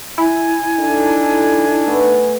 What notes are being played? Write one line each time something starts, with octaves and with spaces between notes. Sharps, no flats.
E4 G#5
D4 D#4 A4
A3 B3